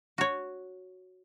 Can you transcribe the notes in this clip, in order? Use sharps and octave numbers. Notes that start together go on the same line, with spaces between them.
F#4 C#5